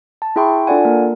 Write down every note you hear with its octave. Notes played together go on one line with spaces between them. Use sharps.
A5
E4 G#4 E5 G5 C6 C#6
D4 F4 A4 D5 F#5 G#5
A#3 A#4